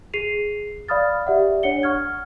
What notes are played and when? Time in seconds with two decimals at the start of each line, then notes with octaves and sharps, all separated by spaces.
0.14 G#4 C7 D#7 F7
0.89 D5 F5 B5 D#6 F6 A6
1.27 G4 D5 E5 F#5
1.63 D4 C#5 F#5 C#7 G7
1.83 F#5 C#6 F6 G#6